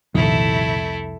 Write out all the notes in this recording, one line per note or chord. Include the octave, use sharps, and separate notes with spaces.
C2 F2 A#2 D#3 G3 A3 E4